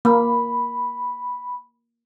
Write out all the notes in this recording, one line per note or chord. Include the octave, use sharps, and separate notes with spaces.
A#3 B5